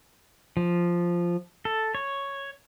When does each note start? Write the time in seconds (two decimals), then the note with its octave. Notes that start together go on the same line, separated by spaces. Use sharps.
0.57 F3
1.65 A4
1.95 C#5